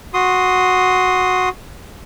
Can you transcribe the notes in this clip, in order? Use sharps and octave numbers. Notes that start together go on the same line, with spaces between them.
F#4 C6 D#6